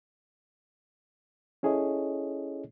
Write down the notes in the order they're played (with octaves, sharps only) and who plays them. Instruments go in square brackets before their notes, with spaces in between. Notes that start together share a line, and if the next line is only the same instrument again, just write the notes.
[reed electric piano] C#4 E4 G#4 A4 C#5 D#5